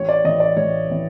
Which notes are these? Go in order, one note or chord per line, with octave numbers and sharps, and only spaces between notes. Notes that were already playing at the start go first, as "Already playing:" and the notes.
Already playing: A1 C#5
D5
A2 E3 D#5
D5
A1 C#5
A2 E3